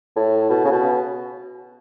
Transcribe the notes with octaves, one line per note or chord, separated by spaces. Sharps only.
A2
B2
C#3
B2